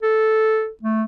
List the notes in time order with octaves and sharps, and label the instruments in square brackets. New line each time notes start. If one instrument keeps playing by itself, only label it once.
[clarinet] A4
A3